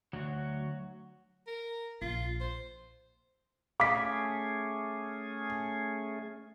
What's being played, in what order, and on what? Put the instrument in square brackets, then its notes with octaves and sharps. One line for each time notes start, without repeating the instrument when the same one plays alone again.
[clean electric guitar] D2 [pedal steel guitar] F#3 F#4
[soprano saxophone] A#4
[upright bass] A#1 [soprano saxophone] F4
[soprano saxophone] C5
[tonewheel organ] A3 C#4 G#4 [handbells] F5 B6 [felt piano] D6